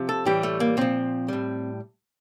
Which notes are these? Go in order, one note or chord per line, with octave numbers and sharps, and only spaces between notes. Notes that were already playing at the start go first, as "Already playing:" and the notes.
Already playing: C3 F3
A4
A2 E3 G3 G4
A3
A#3
A#2 F3 C4
A2 G3